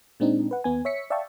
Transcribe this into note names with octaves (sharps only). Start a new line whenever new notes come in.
A#2 G#3 C4 D4 D#4
B4 F#5
D#2 B3 G#5
C#5 E5 B6 C#7
D5 E5 F5 G5 A5 C#6